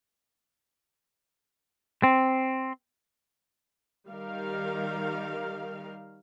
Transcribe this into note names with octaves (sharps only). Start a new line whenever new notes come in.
C4
D#3 G3 A#4 F5